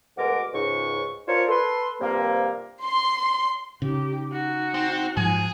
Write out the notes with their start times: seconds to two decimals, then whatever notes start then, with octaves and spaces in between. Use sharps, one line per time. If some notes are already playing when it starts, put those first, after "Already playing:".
0.17 D2 B2 G#3 F#4 A#4 D6
0.53 C#2 G#2 C#6
1.28 D4 F4 A#4 C5 C#5
1.48 A4 B4 C6
2.01 G2 C3 F3 A#3
2.85 C6
3.82 C#3 D#4 G4
4.29 D#4 F#4
4.74 C4
5.17 G#2 F3 G#4 G#5